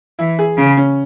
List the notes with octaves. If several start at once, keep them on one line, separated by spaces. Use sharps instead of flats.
E3 E4
G#4
C#3 C#4
C#4